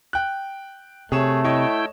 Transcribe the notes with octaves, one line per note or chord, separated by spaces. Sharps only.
G5 F#6
C3 A3 G#4 C#5 E7
E4 C#5 D#5 G5